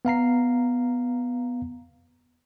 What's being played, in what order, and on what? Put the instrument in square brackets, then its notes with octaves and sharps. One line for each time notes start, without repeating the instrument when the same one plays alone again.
[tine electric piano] B3 F5 A#5 C7